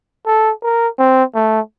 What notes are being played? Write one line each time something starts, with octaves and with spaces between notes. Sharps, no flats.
A4
A#4
C4
A3